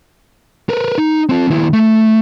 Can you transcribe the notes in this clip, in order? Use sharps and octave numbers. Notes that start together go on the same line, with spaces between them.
A#4 B4
D#4
C4 F4
D#2 E4
A3